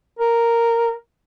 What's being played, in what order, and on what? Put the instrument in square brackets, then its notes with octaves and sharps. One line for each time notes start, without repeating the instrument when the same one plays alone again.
[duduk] A#4